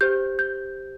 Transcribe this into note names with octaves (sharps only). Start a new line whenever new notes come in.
G4 C5 G6
G6